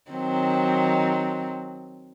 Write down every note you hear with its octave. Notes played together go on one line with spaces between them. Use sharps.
D#3 F#3 C4